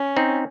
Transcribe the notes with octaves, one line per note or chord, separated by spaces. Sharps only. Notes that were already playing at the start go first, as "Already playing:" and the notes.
Already playing: C#4
C4 D#4